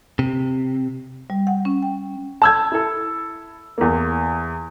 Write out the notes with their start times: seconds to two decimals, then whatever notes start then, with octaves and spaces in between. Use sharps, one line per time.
0.19 C3
1.30 G3
1.47 F#5
1.65 C#4
1.82 G5
2.42 A5 E6 G#6
2.72 E4 A4
3.78 E2 A#3